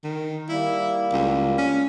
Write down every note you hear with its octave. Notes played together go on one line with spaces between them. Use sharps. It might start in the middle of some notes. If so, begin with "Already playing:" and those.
D#3
G3 A#3 E4
C#2
C#4